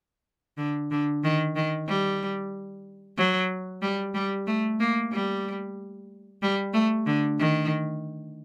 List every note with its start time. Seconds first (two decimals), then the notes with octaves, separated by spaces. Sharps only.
0.58 D3
0.91 D3
1.24 D#3
1.56 D#3
1.88 G3
3.17 F#3
3.82 G3
4.14 G3
4.47 A3
4.80 A#3
5.12 G3
6.42 G3
6.74 A3
7.07 D3
7.39 D#3